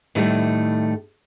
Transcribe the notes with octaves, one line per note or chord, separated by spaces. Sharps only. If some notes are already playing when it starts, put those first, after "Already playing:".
A2 D#3 G3 A3 E4